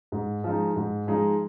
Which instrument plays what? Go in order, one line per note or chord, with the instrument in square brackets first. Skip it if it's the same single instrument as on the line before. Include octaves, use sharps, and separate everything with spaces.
[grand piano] G#2
F3 G#3 D#4
G#2
F3 G#3 D#4